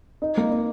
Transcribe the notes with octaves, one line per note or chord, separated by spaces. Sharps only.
D#4
A#3
D#4